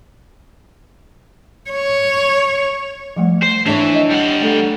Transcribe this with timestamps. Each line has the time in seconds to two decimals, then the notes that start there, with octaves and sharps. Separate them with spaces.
1.70 C#5
3.16 F3 G3 A3
3.42 C5
3.66 E3 D4 C#5 E5
3.94 D#5
4.11 G3 F#5
4.41 A3 A4